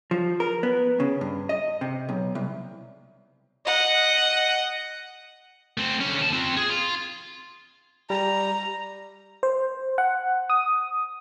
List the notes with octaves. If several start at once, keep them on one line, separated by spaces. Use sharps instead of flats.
F3
A#4
B3
C#3
G2
D#5
C3
B1
C2
D#5 F#5
A3 C4
D3 C#4
D#2 A5
C4 F4
G#4
F4
G3 A#5
C5
F#5
D#6